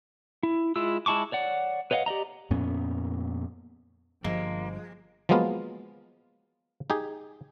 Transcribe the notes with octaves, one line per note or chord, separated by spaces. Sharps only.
E4
G#3 E4 F4 E6
G#3 E4 A5 C#6 D6
C#5 D5 F#5
B4 C#5 D#5 F5 F#5
G4 D5 D#5 A#5
F2 A#2 B3 C#4
G1 G2 F3 G3 G#3 A#3
F3 F#3 G#3 A#3 B3 F4
D#4 G4 G#4